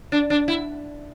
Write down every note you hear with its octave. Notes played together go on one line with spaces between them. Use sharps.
D4
D4
E4